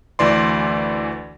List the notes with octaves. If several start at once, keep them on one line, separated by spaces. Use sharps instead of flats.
D2 E3 D5 C6